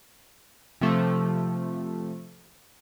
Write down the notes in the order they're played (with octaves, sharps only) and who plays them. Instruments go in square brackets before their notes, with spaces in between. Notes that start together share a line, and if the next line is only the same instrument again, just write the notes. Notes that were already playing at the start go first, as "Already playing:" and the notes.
[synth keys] C3 F3 A3